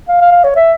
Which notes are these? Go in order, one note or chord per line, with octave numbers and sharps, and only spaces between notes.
F5
F5
F5
C#5
E5